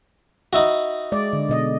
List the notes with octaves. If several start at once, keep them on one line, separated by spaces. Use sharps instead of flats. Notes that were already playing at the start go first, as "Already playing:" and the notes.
D#4 E4 F#4
G#3 D5
D3
B2 D#5